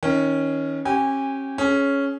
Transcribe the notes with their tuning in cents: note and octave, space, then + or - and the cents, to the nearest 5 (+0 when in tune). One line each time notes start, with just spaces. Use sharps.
D#3 +25 C#4 -5
C#4 -35 G4 -25 G#5 -25
C#4 +0 G#4 +25